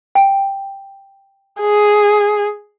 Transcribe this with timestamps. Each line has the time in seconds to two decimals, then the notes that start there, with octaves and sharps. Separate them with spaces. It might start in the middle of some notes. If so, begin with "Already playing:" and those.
0.15 G5
1.60 G#4